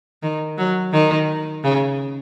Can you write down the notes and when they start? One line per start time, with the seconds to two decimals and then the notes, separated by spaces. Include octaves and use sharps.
0.23 D#3
0.58 F#3
0.92 D#3
1.64 C#3